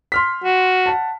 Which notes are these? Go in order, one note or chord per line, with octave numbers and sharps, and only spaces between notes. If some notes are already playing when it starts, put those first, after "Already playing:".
C6 F6 B6
F#4
F#5 A5